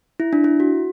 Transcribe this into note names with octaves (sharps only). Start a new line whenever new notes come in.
E4
D4
E4
F#4